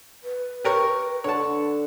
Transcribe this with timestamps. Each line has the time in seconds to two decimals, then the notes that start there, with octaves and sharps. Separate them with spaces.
0.23 B4
0.64 G4 A#4 C#5
1.24 D3 C#5 F#5 A5